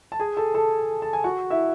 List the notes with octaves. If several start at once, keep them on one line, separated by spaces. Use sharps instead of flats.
A5
G#4 G#5
A4 A5
A4 A5
A5
G#5
F#4 F#5
E4 E5